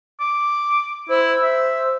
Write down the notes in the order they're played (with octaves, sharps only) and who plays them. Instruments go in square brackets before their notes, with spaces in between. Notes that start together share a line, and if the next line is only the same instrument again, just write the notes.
[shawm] D6
[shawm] E4 [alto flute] C5
[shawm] E5